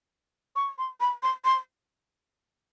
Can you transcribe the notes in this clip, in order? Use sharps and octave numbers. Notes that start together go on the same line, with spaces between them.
C#6
C6
B5
C6
C6